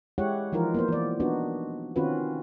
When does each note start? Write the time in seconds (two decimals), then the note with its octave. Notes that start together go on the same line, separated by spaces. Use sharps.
0.18 G#3 E4 G4 C#5 F#5
0.53 E3 F3 D#4 F4 A#4
0.74 A#3 B3 C5
0.88 E3 D5
1.20 B3 D4 D#4 F#4
1.96 D#3 C4 C#4 F4 F#4 B4